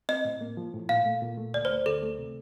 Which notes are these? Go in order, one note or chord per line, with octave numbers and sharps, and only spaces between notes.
C4 D#5
A2
A#3
F3
A2
A#2 F5
A3
A#2
A3
D2 D5
A3 C5
D2 A4
A3
C3